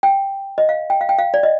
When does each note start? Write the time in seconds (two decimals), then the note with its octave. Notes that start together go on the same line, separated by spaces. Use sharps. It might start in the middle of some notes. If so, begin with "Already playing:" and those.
0.03 G5
0.58 D#5
0.69 F5
0.90 G5
1.01 F5
1.09 G5
1.19 F5
1.34 D5
1.43 D#5